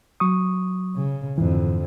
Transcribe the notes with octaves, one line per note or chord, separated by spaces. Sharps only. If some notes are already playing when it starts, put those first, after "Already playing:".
F#3 C#6 D#6
C#3
F2 G#2 D3 E3